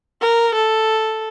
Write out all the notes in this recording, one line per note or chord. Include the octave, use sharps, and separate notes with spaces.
A#4
A4